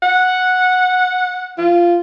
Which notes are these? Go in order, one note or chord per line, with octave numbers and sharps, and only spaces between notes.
F#5
F4